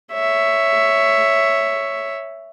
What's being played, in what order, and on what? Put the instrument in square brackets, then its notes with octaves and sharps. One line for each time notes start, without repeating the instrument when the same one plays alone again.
[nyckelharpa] C#5 E5